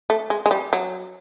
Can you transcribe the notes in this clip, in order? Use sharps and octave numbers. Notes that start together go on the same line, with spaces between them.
A3
G#3
G#3
G3
F#3